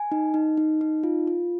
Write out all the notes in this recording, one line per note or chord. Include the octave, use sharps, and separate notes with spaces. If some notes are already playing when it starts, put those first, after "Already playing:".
Already playing: G#5
D#4
D#4
D#4
D#4
F4
F4